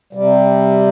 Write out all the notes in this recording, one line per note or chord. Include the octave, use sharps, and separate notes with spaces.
C3 G3